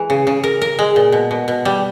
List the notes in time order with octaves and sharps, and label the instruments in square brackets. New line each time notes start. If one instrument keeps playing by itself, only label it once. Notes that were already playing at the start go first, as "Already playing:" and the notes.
Already playing: [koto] E3 G#3
C#3
C#3
A#4
A#4
G#3
A#2
B2
B2
B2
G3